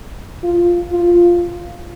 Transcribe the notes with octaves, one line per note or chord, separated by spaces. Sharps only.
F4
F4